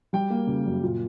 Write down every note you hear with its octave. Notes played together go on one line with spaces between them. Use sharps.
G3 G5
A#3
C#3
F#2
A#2